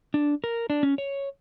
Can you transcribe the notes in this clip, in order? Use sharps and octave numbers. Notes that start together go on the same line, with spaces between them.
D4
A#4
D4
C#4
C#5